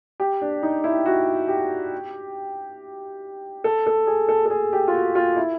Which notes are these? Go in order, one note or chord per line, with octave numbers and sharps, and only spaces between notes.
G4
D4
D#4
E4
F#4
G4
A4
A4
G#4
A4
A4
G#4
G4
F4
F#4
F4
E4